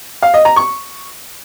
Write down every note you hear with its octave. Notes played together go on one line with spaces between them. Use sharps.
F5
D#5
A#5
C#6